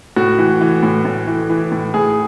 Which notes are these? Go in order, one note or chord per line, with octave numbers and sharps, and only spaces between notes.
A2 F#4
E3
E3
A2
A2
E3
E3
A2
A2 G#4